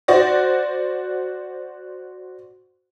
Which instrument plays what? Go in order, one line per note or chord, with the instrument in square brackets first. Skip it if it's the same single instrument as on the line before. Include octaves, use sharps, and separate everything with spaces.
[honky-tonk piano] F#4 C5 D5 F#5 A#6